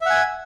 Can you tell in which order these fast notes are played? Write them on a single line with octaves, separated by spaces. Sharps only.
E5 F#5 G#5